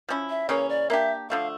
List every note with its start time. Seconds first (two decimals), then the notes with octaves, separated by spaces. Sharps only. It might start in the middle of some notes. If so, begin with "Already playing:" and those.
0.09 F3 C#4 E4
0.29 E5
0.49 C#3 E3 A#3 C#4 C#5
0.69 D5
0.90 A#3 D4 G4 E5
1.30 D3 F3 A3 F5